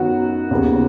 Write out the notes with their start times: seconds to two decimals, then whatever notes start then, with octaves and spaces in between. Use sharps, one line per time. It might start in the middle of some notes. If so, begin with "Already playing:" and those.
Already playing: F#2 D#3 B3 F#4
0.51 D#2 C#3 B3